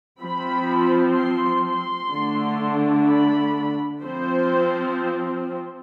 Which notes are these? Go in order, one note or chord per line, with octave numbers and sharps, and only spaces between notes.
F3 C4 B5
C6
C6
D3 A3 D4
B5
F3 C4 C5